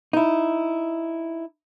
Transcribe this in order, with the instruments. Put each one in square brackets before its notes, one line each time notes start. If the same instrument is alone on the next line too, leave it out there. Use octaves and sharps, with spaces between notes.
[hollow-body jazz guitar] D#4 E4